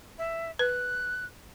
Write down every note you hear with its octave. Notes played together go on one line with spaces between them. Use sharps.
E5
B4 F#6